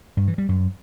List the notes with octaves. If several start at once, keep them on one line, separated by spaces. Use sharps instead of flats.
G2
E3
G3
F#2